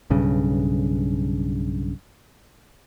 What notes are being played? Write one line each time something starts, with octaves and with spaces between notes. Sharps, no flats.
B1 G2 C#3